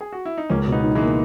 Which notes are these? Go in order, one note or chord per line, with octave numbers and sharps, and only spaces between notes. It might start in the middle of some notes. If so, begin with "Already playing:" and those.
G#4
F#4
E4
D#4
C#2 A#3 C#4
B2
B3 D#4
D#4
E3 G#3
A#3